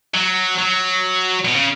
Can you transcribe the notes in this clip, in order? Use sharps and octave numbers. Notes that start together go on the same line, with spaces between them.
F#3
F#3
B2
C#3